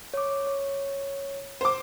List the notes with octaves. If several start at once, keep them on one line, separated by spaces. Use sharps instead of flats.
C#5 D6
C#5
C5 D6